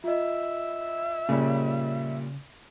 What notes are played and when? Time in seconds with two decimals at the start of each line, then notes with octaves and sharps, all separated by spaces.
0.04 F4 D#5 E5
1.29 A#2 C#3 G3